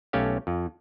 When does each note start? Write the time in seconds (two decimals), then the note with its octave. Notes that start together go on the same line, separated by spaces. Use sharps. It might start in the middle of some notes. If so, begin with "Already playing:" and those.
0.13 B1 A3 C#4 G4 C#5 F5
0.47 F2